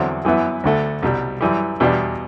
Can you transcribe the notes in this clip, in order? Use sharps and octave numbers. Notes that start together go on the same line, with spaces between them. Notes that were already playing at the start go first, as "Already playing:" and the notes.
Already playing: E2 D3 F#3 C4 E4
F#2 E3 B3 E4
D2 D3 A3
C2 B2 G3
F#2 E3 G3
E2 B2 G3 D4 G4